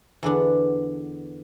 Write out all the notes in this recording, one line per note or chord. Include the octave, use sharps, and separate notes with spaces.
E2 D3 B3 D4